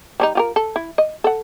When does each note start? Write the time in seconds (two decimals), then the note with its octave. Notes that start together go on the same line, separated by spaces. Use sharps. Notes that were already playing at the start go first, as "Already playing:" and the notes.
0.20 G3 D4 D#4
0.35 F4 G4 A#4
0.56 A4
0.76 E4
0.98 D#5
1.24 A4 F#5